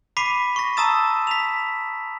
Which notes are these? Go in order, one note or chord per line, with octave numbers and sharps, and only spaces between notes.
B5 D6 B6 C7 D#7
C#6 A#6
A5 A#5 D#6 E6 A6 E7
B6 F7